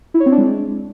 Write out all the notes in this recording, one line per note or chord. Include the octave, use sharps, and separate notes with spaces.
E4
C#5
C4
D4
G#3